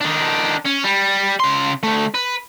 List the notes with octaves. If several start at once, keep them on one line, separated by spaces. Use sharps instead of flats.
D#3 D4
C#4
G3
C#3 C6
D2 A3
B4